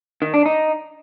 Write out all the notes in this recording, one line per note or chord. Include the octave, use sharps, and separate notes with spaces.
D#3
D4
D#4